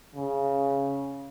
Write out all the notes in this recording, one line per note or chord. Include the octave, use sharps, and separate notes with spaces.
C#3